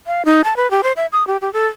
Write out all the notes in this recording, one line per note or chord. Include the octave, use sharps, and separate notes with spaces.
F5
D#4
A5
B4
G4
C5
E5
D#6
G4
G4
A4